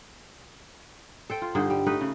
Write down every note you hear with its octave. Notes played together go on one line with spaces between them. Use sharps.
A4 C5 G5
F4
G2 D3 D#4 C5
G3
A3 D#4 B4
C#3